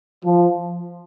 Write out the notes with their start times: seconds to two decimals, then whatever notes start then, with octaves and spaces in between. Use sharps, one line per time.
0.25 F3